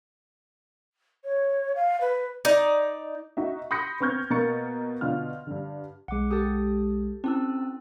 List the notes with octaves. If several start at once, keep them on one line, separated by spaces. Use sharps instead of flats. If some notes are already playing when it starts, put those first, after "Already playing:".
C#5
F5
B4
D#4 D5
D#4 F#4 E5
B5 C6 D#6 G6 A#6 C#7
B3 C4 C#6 F6 G6 G#6
B2 A#3 A#5 C#6 A6 C#7
B2 D3 F4 F6
G2 D3
B1 G#3 F#5 D6
G4 A4 D#6
C4 C#4 E4 A5 E6